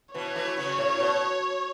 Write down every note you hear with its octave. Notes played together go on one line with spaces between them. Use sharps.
B2 E3 C#5
E3 A3
C#3 F#3
A2
B2